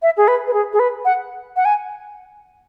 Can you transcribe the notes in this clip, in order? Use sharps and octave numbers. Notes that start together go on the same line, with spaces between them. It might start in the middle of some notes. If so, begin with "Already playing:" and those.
E5
G#4
B4
B4
G#4
G#4
B4
F#5
F#5
G#5